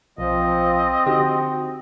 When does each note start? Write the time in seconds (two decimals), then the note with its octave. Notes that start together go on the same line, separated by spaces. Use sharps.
0.18 B1 F3 C4 D#5
1.06 D3 D#4 F#4 G4